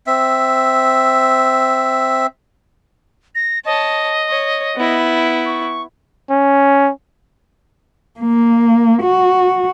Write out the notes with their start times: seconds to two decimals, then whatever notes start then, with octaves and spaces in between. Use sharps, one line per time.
0.07 C4 E5
3.35 A#6
3.65 C#5 D#5 A5
4.30 C#5
4.76 B3 E4
5.46 C#6
6.30 C#4
8.20 A#3
9.03 F#4